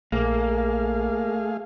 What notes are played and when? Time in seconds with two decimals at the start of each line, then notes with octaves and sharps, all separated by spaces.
0.12 A#1 A3 A#3 G#4 F5